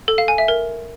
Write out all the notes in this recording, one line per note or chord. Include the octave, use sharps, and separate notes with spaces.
A4
F5
G#5
E5
A#4